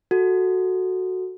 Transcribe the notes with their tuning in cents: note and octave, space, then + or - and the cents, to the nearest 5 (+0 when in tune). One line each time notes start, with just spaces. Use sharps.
F#4 +0 A4 +0